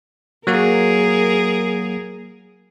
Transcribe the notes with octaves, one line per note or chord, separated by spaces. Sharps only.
F#3 A#3 F#4 G#4 A#4